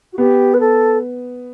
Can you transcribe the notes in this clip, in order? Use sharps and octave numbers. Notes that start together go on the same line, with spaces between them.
F#4
B3 G4
B4
A4